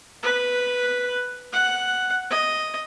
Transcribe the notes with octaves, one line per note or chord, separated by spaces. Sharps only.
B4
F#5
D#5